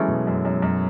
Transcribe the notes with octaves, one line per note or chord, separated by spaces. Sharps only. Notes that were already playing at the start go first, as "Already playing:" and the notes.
Already playing: E3 F#3 G#3 A3 C#4
B2
F#2
F#2
F#2